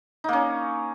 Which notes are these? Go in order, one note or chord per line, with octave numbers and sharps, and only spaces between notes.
A#3 C#4 D#4